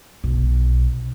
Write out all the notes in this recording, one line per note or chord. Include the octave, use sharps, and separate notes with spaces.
B1